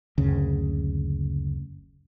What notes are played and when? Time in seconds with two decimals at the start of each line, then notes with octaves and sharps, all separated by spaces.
0.18 F#1 D2 C#3